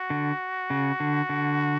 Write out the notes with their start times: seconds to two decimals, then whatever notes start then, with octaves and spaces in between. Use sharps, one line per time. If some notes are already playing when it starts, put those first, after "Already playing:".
Already playing: F#4
0.10 D3
0.70 C#3
1.00 D3
1.29 D3